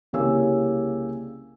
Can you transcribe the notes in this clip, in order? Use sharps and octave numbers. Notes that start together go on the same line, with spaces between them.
C2 C#3 A#3 G4 G#5 E6